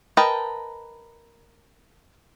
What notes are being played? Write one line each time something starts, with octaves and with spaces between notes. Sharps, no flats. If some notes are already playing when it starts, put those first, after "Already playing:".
A#4 B4 D#5 G5 A5